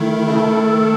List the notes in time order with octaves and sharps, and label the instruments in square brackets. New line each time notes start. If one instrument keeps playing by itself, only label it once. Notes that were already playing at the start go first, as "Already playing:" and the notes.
Already playing: [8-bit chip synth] D#3 [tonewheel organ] A3 E4
[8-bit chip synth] C#3
[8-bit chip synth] D#3 [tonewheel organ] A4